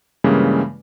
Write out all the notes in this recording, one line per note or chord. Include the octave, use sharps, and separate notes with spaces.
G2 C#3 E3 G3 G#3 A#3